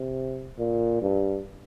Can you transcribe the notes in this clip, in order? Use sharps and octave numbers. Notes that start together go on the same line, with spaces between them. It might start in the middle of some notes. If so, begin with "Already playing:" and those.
Already playing: C3
A#2
G2